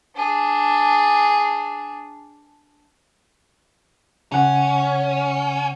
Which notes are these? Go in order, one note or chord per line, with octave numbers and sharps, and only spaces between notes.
D4 G#4
C#3 C#4 F#5